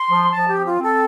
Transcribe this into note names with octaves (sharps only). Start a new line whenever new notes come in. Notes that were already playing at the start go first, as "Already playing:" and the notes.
Already playing: C6
F3
F3 A5
G4
C4
F4
C4
A4